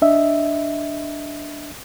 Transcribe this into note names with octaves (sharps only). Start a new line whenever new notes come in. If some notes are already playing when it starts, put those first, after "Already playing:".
D4 D#5 E5